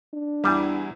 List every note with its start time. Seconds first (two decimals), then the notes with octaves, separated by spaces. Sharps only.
0.13 D4
0.44 E2 G3 E4 G#5